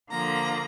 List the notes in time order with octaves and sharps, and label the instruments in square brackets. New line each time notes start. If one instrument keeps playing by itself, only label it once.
[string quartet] D3 F3 A#3 A#5